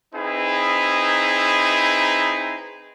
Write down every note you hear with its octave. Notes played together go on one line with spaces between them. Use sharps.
C4 D#4 E4 G#4 B4